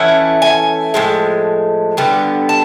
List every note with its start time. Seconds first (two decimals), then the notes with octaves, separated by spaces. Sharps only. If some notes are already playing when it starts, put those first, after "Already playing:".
Already playing: E3 A3 C#4 E4 F#5
0.42 G#5
0.94 A2 F3 G#3
1.97 D3 G3 B3
2.49 A5